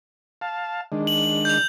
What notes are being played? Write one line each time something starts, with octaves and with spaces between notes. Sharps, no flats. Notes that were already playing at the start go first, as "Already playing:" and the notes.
F5 A5
D#3 G#3 D4
F#7
G6 F7